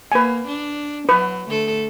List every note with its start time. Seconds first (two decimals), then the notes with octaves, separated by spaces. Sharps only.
0.12 A#3 B4 G#5
0.48 D4
1.09 F#3 B4
1.47 D3 A3 A4